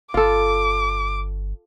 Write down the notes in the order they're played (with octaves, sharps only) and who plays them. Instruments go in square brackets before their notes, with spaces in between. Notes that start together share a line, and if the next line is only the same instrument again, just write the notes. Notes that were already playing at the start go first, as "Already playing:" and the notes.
[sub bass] G1 [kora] F4 A4 [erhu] D6